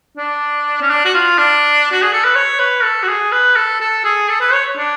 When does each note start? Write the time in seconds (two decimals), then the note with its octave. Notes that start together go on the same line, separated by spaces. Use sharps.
0.17 D4
0.82 C#4
0.90 D4
1.05 F#4
1.14 F4
1.38 D4
1.91 F#4
2.02 G#4
2.13 A4
2.24 B4
2.35 C#5
2.59 B4
2.83 A4
3.03 F#4
3.08 G#4
3.32 B4
3.56 A4
3.80 A4
4.04 G#4
4.29 A4
4.41 B4
4.53 C#5
4.77 D4